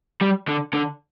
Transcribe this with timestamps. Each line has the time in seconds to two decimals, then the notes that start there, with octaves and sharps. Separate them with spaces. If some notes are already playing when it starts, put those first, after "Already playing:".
0.22 G3
0.48 D3
0.74 D3